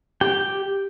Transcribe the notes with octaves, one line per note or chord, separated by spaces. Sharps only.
G4 G5